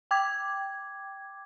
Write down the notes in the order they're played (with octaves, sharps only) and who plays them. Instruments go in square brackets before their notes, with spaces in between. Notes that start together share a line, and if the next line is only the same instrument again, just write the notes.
[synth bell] G5 D6 G#6